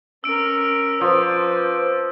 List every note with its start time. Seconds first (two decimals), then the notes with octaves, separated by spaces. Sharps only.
0.24 C#4 A#4 E6 D7
1.01 F3 B4 C5 D5